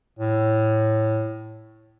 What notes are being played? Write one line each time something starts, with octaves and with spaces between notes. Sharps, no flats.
A2